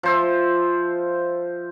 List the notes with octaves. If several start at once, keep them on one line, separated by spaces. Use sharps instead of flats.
F3 C5 E5